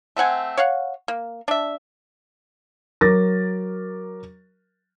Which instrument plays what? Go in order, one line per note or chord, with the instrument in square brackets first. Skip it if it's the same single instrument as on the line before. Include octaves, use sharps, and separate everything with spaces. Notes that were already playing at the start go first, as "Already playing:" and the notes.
[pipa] A3 C4 F#5 G#5
C#5 F5 F#5
A#3
D4 E5
[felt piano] F#3 A#4 D6 A6 A#6